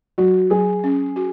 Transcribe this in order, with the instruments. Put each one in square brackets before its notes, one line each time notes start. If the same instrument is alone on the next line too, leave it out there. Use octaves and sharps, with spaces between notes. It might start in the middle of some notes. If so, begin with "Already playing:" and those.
[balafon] F#3 [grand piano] F#4
[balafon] F#3 [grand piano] G#4
[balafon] C#4
F#4